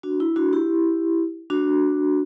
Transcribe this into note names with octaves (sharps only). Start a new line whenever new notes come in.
D4 F#4
E4
D4 F#4
E4 G4
D4 F#4